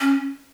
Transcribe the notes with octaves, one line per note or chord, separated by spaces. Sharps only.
C#4